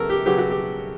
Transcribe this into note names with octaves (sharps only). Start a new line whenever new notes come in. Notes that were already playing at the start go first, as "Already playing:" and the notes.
Already playing: C#3 F#3 B3 A4 A#4
G4
C#3 F#3 B3 G4
F#4
G4